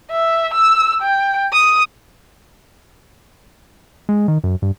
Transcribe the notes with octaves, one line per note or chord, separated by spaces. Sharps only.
E5
E6
G5
D#6
G#3
D#3
F#2
G2